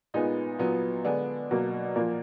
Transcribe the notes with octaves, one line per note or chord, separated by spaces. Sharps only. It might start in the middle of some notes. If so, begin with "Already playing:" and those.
A#2 G#3 B3 D#4
A#2 F#3 B3
D3 G#3 B3 D4
B2 F#3 A#3
A#2 F3 A#3